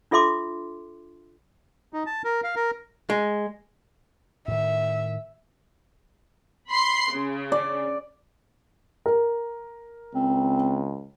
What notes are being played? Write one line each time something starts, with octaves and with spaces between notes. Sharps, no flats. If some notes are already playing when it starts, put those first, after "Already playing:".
D4 F4 A4 E5 C6 D6
D#4
A5
A#4
F5
A#4
G#3
A2 D#3 E5
B5 C6 C7
C#3
D5
A#4
C#2 C4